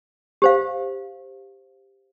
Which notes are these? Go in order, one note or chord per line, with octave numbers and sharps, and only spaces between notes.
G4 C5 F5